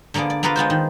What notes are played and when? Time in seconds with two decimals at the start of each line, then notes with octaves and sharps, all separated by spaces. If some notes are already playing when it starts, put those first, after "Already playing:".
0.14 D3 A#3 B3 G#4 D5
0.30 D5
0.43 A#3 B3 F4 A#4 B4 F5
0.56 G#3 B3 F4 C5
0.70 D#3